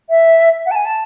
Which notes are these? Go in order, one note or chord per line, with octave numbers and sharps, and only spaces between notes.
E5
F#5
A5
G#5
A5